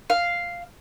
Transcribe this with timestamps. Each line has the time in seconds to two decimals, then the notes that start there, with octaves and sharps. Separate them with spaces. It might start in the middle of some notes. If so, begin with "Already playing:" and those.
0.10 F5